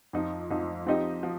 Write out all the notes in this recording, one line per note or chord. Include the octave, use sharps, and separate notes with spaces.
F2 F3 D#4
F2 F3 D#4
F3 C4 D#4 G4 D#5
F3